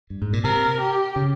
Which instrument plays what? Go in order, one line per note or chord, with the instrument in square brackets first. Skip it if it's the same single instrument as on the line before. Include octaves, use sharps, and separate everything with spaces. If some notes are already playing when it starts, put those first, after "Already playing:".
[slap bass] G2
G#2
A#2
[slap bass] C3 [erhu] A#4
[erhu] G4
[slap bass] C#3